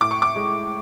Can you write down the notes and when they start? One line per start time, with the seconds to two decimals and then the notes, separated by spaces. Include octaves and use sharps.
0.01 A2 D6
0.11 C#6
0.22 D6
0.36 G#3